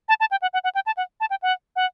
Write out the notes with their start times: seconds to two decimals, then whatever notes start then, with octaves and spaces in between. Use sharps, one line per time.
0.09 A5
0.20 A5
0.31 G5
0.42 F#5
0.53 F#5
0.64 F#5
0.75 G5
0.86 A5
0.97 F#5
1.20 A5
1.30 G5
1.42 F#5
1.76 F#5